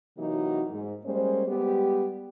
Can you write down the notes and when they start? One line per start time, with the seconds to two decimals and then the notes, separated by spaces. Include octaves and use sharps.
0.18 C3 E3 F#3 A#3 D#4 F#4
0.71 G#2
1.05 G3 G#3 A#3 C#4 C5
1.46 G3 G#3 B3 G4